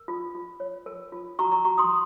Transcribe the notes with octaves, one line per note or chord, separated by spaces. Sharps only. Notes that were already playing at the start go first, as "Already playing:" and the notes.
Already playing: A#4
F4
F4
C#5
A#4
F4
F#4 A#5 C#6
A#5 C#6
F#4 A#5 C#6
C6 D#6